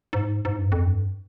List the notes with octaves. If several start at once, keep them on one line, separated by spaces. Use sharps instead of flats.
G#2
G#2
G2
F2
G2